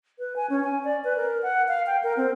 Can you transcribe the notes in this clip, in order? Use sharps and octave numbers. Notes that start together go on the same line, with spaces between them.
B4
G#5
C#4
G#5
D5
B4
A#4
F#5
F5
G5
A#4
C4